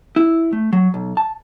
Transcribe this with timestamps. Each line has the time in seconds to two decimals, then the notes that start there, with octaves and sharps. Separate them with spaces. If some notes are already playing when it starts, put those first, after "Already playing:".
0.16 E4
0.53 A3
0.73 F#3
0.94 B1
1.17 A5